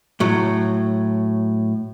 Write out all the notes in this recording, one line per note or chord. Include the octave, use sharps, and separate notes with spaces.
A2 F#3